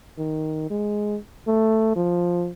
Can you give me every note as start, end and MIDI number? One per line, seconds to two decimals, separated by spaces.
0.18 0.69 51
0.70 1.16 56
1.47 1.91 57
1.96 2.50 53